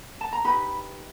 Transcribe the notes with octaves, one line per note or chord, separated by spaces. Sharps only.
A5
A#5
D#4 G4 B4 B5